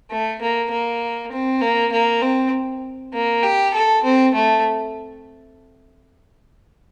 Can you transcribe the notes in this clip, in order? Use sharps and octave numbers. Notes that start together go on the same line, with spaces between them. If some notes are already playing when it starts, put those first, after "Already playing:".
A3
A#3
A#3
C4
A#3
A#3
C4
A#3
G4
A4
C4
A3